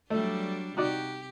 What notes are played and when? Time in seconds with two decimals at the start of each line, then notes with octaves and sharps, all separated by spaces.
0.10 F#3 G3 A3 D4
0.77 C3 D#4 F#4 G4 D5